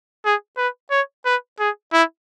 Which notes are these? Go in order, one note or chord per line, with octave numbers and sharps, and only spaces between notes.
G#4
B4
C#5
B4
G#4
E4